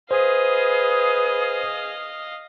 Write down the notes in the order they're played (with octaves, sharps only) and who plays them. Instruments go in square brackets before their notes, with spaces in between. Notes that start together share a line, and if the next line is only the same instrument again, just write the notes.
[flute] G#4 [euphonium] B4 [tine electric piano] C5 [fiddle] D#5 F5